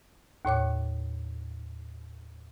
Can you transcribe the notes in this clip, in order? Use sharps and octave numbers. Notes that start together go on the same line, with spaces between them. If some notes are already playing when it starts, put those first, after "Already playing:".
D#2 A2 C#5 D6